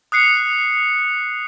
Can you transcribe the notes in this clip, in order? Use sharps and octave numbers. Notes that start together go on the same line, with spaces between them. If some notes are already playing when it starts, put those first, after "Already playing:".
D#6 F#6 C7 C#7